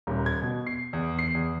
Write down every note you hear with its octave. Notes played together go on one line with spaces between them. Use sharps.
D#1
G#6
B2
C7
E2
C7
E2